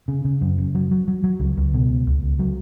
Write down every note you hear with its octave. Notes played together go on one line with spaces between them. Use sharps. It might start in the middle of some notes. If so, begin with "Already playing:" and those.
C#3
C#3
F#2
F#1
F#3
F#3
F#3
F#3
C#2
C#2
B2
C#2
C#2
C#2
F#3